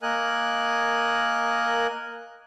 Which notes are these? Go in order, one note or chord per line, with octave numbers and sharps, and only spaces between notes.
A#3 A#4 D#5 G#5 F#6